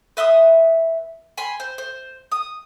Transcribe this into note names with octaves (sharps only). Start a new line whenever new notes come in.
B4 E5 C6 D#6
G#5 B5 C6
C5
C5
D#6